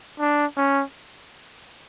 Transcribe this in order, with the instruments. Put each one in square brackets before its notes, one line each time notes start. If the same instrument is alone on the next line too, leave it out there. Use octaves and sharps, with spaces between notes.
[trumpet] D4
C#4